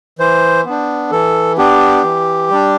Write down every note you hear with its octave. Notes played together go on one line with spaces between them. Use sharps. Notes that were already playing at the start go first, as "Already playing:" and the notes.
E3 C5
B3 D4
E3 A4
B3 D4 G4
E3
G3 D4